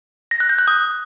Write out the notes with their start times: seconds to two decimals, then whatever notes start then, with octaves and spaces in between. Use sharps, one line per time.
0.31 A#6
0.40 F#6
0.49 G6
0.59 F#6
0.68 D#6